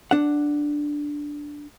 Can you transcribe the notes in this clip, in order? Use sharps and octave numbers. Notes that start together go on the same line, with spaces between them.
D4 F#5